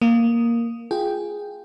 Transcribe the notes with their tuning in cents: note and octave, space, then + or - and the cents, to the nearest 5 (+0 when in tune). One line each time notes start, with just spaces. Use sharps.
A#3 +0 D#6 +0
F4 -5 G#4 +0 G5 +0